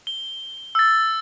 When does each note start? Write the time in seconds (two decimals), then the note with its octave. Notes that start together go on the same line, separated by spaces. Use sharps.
0.07 G7
0.75 E6 A6